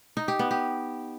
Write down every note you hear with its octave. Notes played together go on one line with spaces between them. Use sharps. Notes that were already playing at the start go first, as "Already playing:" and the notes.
D#4
G4
B3
G4